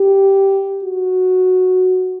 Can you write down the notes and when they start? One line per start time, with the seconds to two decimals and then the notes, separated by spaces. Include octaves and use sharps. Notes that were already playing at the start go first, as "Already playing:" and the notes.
Already playing: G4
0.84 F#4